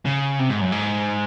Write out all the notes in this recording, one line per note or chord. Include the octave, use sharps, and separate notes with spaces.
C#3
C3
G#2
F#2
G#2